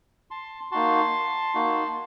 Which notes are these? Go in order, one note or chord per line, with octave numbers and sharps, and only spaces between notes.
A5 C6
A#3 D#4 F#4 A5 C6
A#3 D#4 F#4